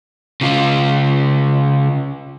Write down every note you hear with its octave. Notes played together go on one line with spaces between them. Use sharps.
C#3 F4